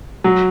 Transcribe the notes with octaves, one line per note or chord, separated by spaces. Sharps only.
F#3